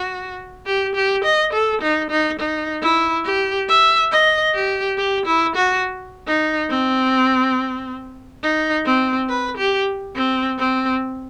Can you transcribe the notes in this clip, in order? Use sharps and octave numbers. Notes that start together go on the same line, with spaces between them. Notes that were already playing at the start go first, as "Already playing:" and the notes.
Already playing: F#4
G4
G4
D#5
A4
D#4
D#4
D#4
E4
G4
E5
D#5
G4
G4
E4
F#4
D#4
C4
D#4
C4
B4
G4
C4
C4